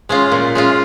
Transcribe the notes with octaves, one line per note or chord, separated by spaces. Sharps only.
G#3 C#4 F4
A#2
G#3 C#4 F4